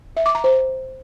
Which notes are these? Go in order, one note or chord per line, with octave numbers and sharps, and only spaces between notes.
E5
D6
A#5
C5